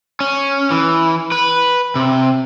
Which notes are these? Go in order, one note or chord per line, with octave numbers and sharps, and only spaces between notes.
C#4
E3
B4
C3